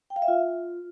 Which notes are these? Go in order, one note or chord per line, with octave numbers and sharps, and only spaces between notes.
G5
F5
E5
F4